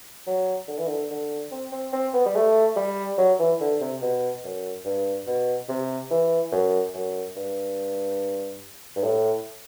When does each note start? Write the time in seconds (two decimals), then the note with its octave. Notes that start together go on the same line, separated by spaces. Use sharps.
0.27 F#3
0.68 D3
0.78 E3
0.87 D3
1.10 D3
1.51 C4
1.72 C4
1.93 C4
2.14 B3
2.26 G3
2.36 A3
2.76 G3
3.18 F#3
3.39 E3
3.60 D3
3.81 C3
4.01 B2
4.44 F#2
4.85 G2
5.27 B2
5.69 C3
6.11 E3
6.52 F#2
6.94 F#2
7.36 G2
8.96 G2
9.03 A2